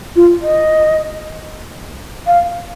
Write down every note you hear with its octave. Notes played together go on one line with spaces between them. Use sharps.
F4
D#5
F5